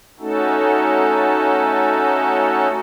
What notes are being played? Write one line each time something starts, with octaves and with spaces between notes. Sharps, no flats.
A3 C#4 D#4 F#4 A4